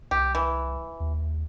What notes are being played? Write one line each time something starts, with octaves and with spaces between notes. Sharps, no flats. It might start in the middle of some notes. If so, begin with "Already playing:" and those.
C2 G4
E3
D#2